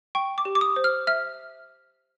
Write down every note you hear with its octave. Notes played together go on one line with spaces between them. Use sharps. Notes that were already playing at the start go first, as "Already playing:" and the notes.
G5 C#6
D6
G4
D6
D#6
C5
F6
E5 F6